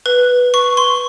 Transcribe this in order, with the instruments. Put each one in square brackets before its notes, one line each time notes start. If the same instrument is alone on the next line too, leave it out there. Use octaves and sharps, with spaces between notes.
[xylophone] B4
C#6
C6